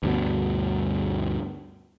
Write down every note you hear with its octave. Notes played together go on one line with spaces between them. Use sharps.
D2 G2 B2